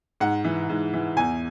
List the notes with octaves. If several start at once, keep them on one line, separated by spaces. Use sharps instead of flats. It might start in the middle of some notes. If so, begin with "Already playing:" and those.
G#2 F#5
E3
G#2
E3
E2 G#5